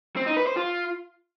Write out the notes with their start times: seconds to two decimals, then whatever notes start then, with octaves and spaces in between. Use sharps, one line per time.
0.17 C4
0.27 D#4
0.37 B4
0.47 C5
0.57 F4